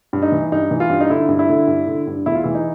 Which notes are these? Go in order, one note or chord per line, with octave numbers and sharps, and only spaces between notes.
G2
D#4
E3
G2 D#4
E3
F4
G2
D#4
D3 E4
G2
E4
D3
G2
D3
G2
E2 E4
F4
E3 E4
D#4